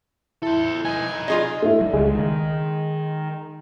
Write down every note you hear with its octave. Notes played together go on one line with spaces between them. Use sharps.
E4 A4 C5
D#4 B4 G#5
F4 G#4 D#5
A3 E4
G3
C#2 G#3
D#3